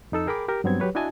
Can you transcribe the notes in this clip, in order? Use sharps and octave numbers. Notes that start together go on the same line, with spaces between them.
F2 D#4 A4 E6
G#4 A#4 G5 B5 D6
G4 A#4
G2 F#3 B3 C4 G#6
F#3 G4 B4 C#5
D4 E4 F#4 D#5 G#5 A5